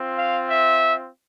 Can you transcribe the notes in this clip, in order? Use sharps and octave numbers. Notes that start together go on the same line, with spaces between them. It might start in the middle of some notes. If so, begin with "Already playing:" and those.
Already playing: C4 F4
F5
E5